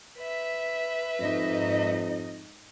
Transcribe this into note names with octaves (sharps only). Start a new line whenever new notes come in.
B4 E5
F2 G#2 D#4 D#5